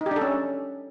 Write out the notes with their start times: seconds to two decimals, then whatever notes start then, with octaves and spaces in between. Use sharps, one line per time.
0.01 D#4
0.06 G4
0.11 D4
0.16 A4
0.21 C#4